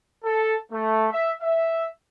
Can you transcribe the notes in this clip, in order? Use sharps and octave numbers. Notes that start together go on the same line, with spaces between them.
A4
A3
E5
E5